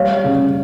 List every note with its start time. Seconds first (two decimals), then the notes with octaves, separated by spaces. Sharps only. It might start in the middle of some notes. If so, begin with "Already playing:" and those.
Already playing: G3 C#5 F5
0.24 C#3